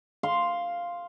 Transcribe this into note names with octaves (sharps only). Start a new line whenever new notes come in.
F5 C6